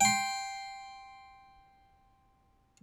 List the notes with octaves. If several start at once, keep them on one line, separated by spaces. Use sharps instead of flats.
G5 C6